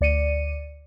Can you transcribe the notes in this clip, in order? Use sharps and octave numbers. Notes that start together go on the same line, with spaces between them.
D2 D5 C#7 D#7